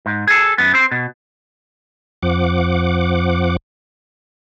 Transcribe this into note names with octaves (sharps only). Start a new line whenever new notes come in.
G#2
G#4 A4
F#2 B3
C4 C5
B2
F2 F3 F#5 D6